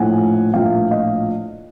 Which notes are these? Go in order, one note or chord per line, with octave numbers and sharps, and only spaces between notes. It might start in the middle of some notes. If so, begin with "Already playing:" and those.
Already playing: A#1 A2 F3 F#5 G#5
A#1 A2 F3 F5 G5
D#5 F5